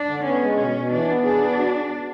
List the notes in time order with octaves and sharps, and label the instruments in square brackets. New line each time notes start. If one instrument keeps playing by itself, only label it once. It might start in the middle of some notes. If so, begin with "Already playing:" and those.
Already playing: [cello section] D4
[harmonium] D3
[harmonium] B3 [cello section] C#4
[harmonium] G#3
[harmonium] B2 [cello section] C#4
[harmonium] B2
[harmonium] E3 [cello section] D4
[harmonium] B3
[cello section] D4 [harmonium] G#4
[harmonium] B3
F#4